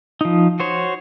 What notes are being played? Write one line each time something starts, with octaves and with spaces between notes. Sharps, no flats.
F3 D#4
F#4 C5 C#5